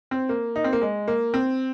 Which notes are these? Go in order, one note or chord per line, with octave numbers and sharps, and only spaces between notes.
C4
A#3
D#4
C4
A#3
G#3
A#3
C4